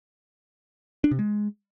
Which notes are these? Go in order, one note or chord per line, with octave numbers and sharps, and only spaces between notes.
D4
C3
G#3